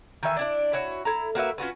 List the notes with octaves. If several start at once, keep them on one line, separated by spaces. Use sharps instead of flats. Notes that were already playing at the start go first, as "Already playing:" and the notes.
D#3 E3 E5 G#5
D4 E4 D5
E4 F#4 C#5
E4 A4 A#5
A#3 F#4 B4 E5
C#4 F4 F#4 B4